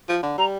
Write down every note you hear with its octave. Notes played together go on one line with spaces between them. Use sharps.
F3
D3
G3 A#5